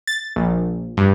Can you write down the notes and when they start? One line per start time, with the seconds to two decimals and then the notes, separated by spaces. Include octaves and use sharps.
0.07 A6
0.36 A#1
0.97 G2